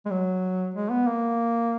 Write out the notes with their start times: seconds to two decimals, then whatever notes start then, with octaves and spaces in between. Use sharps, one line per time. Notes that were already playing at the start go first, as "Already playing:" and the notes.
0.06 G#3
0.11 F#3
0.74 G#3
0.91 B3
1.07 A#3